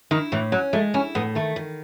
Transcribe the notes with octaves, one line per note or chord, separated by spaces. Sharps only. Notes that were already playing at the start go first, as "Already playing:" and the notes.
D#3 E4
A2 E3
F#3 C#4
G#3 A3
C#4 E4
A2 B3
D#3 A3
D#3